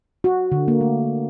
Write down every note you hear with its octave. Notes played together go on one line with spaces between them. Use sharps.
F#4
D3
A#3
A3